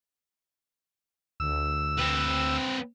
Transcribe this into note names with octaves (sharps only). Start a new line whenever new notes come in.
D2 E6
C4 B4